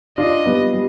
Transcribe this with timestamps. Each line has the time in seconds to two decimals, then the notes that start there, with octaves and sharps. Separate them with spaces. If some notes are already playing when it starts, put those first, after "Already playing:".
0.18 D4 F4 D#5
0.46 G3 B3
0.73 G3